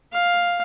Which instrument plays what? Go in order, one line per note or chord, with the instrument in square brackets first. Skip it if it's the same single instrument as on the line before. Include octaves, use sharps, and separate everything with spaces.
[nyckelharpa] F5